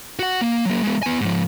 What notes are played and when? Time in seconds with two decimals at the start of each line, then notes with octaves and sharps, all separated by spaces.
0.19 F#4 F#5
0.41 A#3
0.65 F#3 A#3
0.83 G#3 B3
1.03 B3 G#5
1.21 G#2 F3